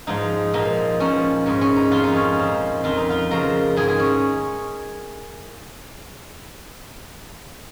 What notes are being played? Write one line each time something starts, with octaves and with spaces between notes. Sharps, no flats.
G#2 F3 D#4
A#2 F3 D#4
A#2 F3 C#4
G#2 D#3 C#4
C#4
D#4
F2 D#3 F4
D#4
C#4
A#2 F3
F2 D#3 F4
D#4
F4
F2 C#3 F3 A#4
G#2 D#3 G#4
G#4
C#4